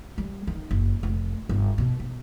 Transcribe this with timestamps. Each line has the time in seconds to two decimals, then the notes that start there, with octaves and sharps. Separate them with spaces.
0.18 G3
0.47 D#3
0.71 F#1
1.03 F1
1.49 G1
1.78 B2
2.00 B2